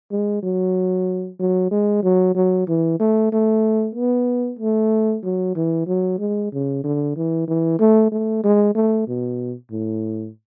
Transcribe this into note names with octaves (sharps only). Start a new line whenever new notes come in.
G#3
F#3
F#3
G#3
F#3
F#3
E3
A3
A3
B3
A3
F#3
E3
F#3
G#3
C#3
D3
E3
E3
A3
A3
G#3
A3
B2
A2